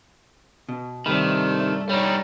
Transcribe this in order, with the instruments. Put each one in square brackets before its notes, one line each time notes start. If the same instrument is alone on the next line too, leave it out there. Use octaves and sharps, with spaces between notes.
[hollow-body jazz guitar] B2
[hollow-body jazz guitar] G2 B5 [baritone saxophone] C3 [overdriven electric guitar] D#3 [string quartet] A3 D5
[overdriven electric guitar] G3 D#4 [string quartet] C#5 D5